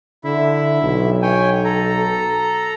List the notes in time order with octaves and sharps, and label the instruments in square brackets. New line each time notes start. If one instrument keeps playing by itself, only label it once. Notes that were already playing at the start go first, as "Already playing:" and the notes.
[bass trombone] D3 [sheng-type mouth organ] E4 E5
[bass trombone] B1
[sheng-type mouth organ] C#5 G5 G#5
A4 A#5